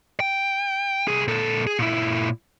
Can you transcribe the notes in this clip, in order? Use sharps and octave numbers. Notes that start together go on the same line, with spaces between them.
G5
C2 G#4
A#2 A4
G#4
A#2 E4